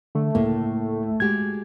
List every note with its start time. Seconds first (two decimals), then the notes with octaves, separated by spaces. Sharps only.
0.15 D3 A3
0.35 C#2 A2 A#3 A4
1.20 G#3 F#4 G4 G#6